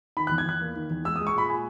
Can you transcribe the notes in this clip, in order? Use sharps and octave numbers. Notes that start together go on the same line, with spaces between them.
D#3 B5
E2 F#6
G#6
E2 F#6
A#3
D#3
E2
G#3 E6
G#3 D#6
C#6
A#2 B5
A#2 G#5